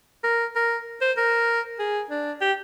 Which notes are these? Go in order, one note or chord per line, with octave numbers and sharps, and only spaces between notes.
A#4
A#4
C5
A#4
G#4
D4
G4